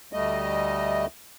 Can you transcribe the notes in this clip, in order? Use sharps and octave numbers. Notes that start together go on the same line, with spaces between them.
D2 G3 A3 D#5